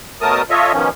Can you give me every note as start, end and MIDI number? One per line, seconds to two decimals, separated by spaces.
0.21 0.42 47
0.21 0.42 54
0.21 0.42 57
0.21 0.42 70
0.21 0.42 81
0.21 0.42 87
0.50 0.72 65
0.50 0.72 69
0.50 0.72 73
0.50 0.72 75
0.50 0.72 76
0.73 0.90 47
0.73 0.90 51
0.73 0.90 53
0.73 0.90 61